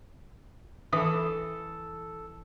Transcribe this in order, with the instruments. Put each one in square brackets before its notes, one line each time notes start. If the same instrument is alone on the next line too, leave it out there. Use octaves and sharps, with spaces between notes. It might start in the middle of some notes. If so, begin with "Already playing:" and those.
[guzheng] E3 [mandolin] A4 D#6